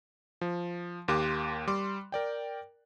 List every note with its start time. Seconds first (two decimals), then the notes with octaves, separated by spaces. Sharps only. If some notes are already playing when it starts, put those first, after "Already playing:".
0.41 F3
1.08 D#2 A#3 G4 C6 D6 F#6
1.67 G3 C6 D6
2.12 A#4 D5 G5